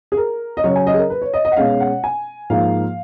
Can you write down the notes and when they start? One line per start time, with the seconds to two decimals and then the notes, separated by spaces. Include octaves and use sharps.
0.12 G#4
0.17 A#4
0.57 D#5
0.64 C#3 F#3 C#4 C#5
0.76 G#5
0.87 D#5
0.94 G#4
0.98 A#4
1.10 B4
1.22 C#5
1.34 D#5
1.45 D#5
1.52 F#5
1.57 B2 G#3 C#4 F5
1.80 F#5
2.04 G#5
2.50 G#2 F3 A#3 F5